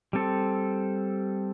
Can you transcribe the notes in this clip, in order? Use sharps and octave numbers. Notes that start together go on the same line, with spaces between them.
G3 C4 A4